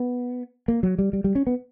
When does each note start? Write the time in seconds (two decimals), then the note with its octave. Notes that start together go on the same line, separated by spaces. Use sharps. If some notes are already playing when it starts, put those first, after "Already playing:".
Already playing: B3
0.68 A#3
0.83 F#3
0.99 G3
1.13 G3
1.24 G3
1.35 C#4
1.47 B3